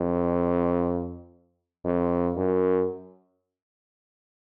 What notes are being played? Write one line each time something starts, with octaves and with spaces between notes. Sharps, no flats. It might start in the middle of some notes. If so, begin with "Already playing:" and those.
Already playing: F2
F2
F#2